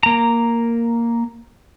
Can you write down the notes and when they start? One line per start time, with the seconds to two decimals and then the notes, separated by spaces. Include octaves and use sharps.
0.03 A#3 A#5